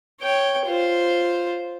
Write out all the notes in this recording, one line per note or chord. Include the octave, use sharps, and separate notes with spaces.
C#5 G5
F4 C5